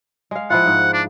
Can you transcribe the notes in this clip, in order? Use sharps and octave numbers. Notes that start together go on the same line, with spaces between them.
G#3 F5
F3 E4 F4 F#5
G#2
D4